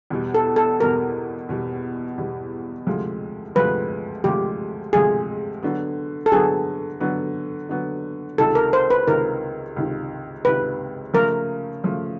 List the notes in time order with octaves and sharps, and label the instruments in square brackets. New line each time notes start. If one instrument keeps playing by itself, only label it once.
[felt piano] E2 B2 G3
[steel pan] A4
A4
[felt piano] E2 B2 G3 [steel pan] A#4
[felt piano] E2 B2 G3
E2 B2 G3
D2 C3 F3 G#3
[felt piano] D2 C3 F3 G#3 [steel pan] B4
[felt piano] D2 C3 F3 G#3 [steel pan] G4
[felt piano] D2 C3 F3 G#3 [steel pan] G#4
[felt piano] D3 F#3 B3
[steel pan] A4
[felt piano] D3 F#3 B3 [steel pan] G#4
[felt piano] D3 F#3 B3
D3 F#3 B3
[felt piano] C#2 C3 D#3 [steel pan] A4
[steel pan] A#4
C5
B4
[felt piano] C#2 C3 D#3 [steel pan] A#4
[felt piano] C#2 C3 D#3
[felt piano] C#2 C3 D#3 [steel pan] B4
[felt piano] C#3 F3 A3 [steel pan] A#4
[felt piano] C#3 F3 A3